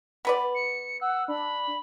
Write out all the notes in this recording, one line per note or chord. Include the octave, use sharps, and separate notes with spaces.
B3 B4 D5
C#7
F#5 E6
D4 B5